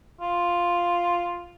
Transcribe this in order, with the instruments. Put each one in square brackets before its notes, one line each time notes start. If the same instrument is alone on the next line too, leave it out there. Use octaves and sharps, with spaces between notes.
[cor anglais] F4